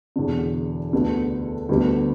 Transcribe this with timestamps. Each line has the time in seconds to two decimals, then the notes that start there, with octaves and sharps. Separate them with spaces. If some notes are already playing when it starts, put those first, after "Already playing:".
0.16 E1 E2 D3
0.93 D2 D3 B3 G4
1.69 D2 D3 G3 B3 G4